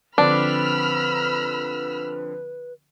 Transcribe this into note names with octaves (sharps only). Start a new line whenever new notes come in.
D3 F3 C4 D4 B4 B5 E6 F6